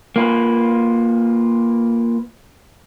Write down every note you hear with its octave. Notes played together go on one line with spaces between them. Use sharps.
A#3 F4 B4